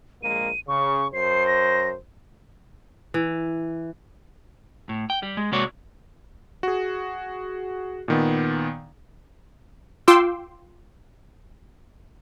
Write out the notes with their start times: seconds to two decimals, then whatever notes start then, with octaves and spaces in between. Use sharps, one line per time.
0.23 A#1 G#3 A#3 D#7
0.68 C#3 C#6
1.13 F#2 C5 C7
1.47 A#6
3.14 E3
4.89 A2
5.10 G5
5.23 G3
5.37 G#3
5.52 C3 G#3 A#3 F#4 C#5 D5
6.63 F#4 G#4
8.08 A#2 D#3 B3
10.08 F4 G5 C6 D6 E6